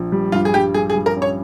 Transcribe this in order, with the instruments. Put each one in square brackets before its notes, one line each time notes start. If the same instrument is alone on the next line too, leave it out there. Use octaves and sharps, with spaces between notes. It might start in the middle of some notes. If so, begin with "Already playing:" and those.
Already playing: [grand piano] A#1
G3
[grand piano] G2 [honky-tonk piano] F4
[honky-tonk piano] G#4
[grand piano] G2 [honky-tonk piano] G4
[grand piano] G3 [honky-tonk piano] G#4
[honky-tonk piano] G#4
[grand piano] G3
[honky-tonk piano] A#4
[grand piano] C#4
[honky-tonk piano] C#5